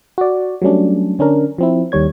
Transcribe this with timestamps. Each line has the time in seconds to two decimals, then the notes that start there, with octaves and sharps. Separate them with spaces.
0.18 F#4 D5
0.62 F#3 G3 A3 C#4 D4
1.19 D3 C#4 D4 A#4
1.58 F3 C4 E4
1.92 D#2 D#3 G3 C#5 G#6